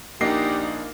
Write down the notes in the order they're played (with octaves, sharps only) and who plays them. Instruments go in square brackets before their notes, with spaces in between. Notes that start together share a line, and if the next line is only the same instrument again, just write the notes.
[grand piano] A#1 D4 D#5 [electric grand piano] A#3 C7 [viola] D#4 F#5 [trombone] G4